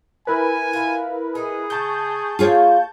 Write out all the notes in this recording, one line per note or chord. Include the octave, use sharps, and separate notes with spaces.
E4 A#4 B4 G#5
F4 E5
D#4 G#4
C#3 A5 C#6 G6
A#3 F4 G#4 C#5 F5